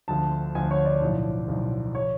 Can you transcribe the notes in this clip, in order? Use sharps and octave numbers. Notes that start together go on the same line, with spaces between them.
D2 D3 F3 A5
D2 D3 F3 G#5
C#5
D5
B1 A2 F3
B1 A2 F3
F3 C#5